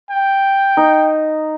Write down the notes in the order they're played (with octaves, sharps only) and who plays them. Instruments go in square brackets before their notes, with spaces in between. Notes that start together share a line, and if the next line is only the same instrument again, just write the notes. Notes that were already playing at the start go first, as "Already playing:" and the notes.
[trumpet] G5
[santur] D#4